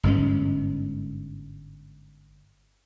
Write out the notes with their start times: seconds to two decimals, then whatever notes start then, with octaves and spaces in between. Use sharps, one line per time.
0.03 G1 G#2 G#3 C#4